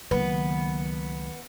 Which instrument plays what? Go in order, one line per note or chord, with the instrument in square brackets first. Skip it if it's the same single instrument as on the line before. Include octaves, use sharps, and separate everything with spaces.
[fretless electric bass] C#2 F#3 A#3 [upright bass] D#3 [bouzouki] B3